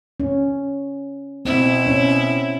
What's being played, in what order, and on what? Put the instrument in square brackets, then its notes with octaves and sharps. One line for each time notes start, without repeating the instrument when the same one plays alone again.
[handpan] C#4
[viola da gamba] B2 E4 [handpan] C4
[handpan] C#4